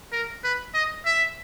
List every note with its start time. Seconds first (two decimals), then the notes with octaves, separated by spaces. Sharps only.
0.12 A#4
0.44 B4
0.74 D#5
1.05 E5